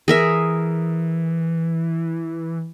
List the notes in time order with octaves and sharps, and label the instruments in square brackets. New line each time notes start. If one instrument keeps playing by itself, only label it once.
[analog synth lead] E3 [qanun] G#4 A#4 E5